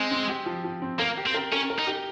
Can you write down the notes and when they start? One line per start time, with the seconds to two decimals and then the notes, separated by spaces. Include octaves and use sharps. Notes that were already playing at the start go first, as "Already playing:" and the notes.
Already playing: G#3 C4
0.11 C4
0.29 G4
0.46 F3
0.64 F3
0.82 C4
0.99 A#3 A#4
1.17 G4
1.26 C4
1.34 A#4
1.53 C#4 A#4
1.70 A#4
1.79 D#4
1.87 G4